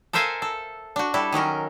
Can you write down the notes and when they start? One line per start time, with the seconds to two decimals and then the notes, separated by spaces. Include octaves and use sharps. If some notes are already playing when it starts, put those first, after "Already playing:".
0.13 A4 A#4 C5 E5 F5 G#5
0.42 A4
0.96 D4 F#4
1.14 G3 E4 A4
1.32 D#3 F#3 C#4 A#4